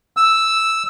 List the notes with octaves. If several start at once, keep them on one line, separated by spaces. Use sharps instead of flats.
E6